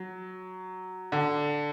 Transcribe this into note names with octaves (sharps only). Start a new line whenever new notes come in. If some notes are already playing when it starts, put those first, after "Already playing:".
Already playing: F#3
D3